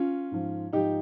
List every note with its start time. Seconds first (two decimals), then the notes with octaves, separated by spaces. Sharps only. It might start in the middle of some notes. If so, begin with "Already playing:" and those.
Already playing: C#4 F4
0.31 G#2 F3
0.73 G#2 F3 D#4 G4